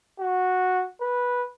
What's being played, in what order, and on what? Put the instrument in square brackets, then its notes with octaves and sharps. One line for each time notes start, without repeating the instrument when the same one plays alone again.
[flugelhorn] F#4
B4